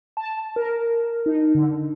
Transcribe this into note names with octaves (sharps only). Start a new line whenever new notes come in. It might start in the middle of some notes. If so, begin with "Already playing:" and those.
A5
A#4
D#4
D3